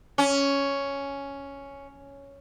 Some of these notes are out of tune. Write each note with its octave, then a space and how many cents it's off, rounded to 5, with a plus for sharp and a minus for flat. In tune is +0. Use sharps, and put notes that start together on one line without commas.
C#4 +5